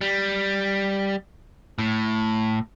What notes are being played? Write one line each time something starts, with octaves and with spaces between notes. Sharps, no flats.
G3
A2